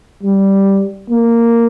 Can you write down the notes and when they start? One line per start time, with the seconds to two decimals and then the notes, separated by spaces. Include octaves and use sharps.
0.23 G3
1.10 A#3